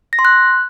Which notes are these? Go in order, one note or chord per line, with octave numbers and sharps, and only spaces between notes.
A#6
C6
F#6